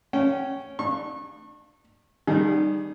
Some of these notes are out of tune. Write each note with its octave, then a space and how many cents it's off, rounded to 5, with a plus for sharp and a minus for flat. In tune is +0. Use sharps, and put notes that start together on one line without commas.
C#4 +0 G5 -25
D4 +35 C#6 -30
D#3 -25 G3 -5 G#4 +0